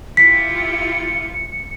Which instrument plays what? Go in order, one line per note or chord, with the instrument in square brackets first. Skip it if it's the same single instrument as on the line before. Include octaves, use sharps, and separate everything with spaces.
[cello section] E4 F4 G4 [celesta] B6 [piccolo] C#7